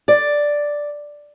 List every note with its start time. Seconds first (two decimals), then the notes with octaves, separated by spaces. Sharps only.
0.08 D5